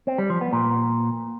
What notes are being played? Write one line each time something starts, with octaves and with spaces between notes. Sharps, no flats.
C4
G3
F3
B3
A#2